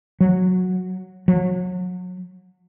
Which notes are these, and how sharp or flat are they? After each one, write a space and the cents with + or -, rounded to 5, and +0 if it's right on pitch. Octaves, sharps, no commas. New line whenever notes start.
F#3 -10
F#3 -30